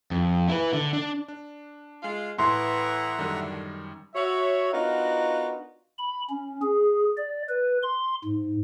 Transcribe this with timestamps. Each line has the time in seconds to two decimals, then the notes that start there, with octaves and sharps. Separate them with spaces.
0.11 F2
0.49 E4 B4
0.73 D3
0.93 D4
1.28 D4
2.03 G#3 F4
2.38 A2 E3 E5 F#5 A#5 C6
3.19 F#2 A2 D3 D#3 G3
4.15 F#4 C#5 E5
4.73 B3 D4 D#4 F4 F#4 A#4
5.98 B5
6.30 C#4
6.62 G#4
7.17 D5
7.49 B4
7.83 C6
8.25 G#2